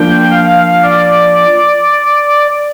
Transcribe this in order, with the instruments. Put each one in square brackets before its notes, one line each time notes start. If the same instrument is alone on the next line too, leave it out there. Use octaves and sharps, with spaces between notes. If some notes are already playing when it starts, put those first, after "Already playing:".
Already playing: [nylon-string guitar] F3 A#3 D4 [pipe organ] G5
[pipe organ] F5
D5